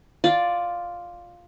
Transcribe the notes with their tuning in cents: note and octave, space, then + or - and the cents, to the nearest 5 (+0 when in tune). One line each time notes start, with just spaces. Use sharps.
F4 +5 D5 +0